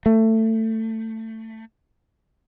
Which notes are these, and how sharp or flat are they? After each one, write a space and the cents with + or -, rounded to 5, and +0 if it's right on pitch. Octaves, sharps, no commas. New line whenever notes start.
A3 +20